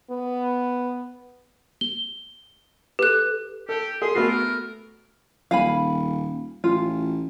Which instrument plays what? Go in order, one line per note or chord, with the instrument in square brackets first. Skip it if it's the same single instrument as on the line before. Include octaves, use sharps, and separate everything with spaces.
[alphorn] B3
[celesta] G7
[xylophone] G4 F#6 [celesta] A4 B4
[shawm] G4 [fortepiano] A4
[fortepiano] G#4 [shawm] C6
[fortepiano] A3 B3 F#4 [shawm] F4
[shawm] A#4
[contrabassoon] D#1 [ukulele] F5 G#5 B5
[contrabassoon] A1 [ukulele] F4